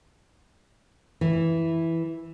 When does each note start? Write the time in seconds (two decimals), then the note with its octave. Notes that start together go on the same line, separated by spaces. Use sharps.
1.21 E3